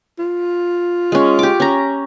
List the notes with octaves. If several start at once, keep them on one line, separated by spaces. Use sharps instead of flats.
F4
G#3 C#4
G4 D6
C#4 A#5